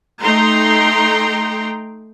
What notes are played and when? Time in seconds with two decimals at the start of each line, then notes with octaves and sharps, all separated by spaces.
0.23 A3 D#4 G5 A#5 C6